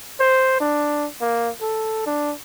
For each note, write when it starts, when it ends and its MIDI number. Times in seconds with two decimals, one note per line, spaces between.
0.20 0.58 72
0.60 1.07 62
1.21 1.50 58
1.61 2.03 69
2.06 2.33 62